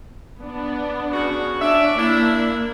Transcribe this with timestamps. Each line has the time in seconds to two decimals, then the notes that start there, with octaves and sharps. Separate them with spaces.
0.42 B3 D4
1.13 C#3 F#4
1.62 C#4 D4 D5 E5
1.98 A#3 D4 E4